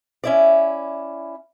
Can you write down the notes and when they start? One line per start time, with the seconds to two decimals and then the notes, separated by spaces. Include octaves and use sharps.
0.24 C#4 E4 D5